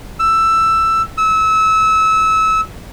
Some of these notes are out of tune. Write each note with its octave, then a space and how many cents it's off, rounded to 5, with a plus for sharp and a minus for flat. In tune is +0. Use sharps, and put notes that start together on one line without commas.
E6 +10
E6 -25